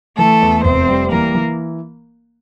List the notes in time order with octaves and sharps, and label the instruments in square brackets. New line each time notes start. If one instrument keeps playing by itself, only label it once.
[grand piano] E3 [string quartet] A3 A4
[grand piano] E2
[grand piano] F1 [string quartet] C4 C5
[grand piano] G3
[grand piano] E3 [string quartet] A#3 A#4
[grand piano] E3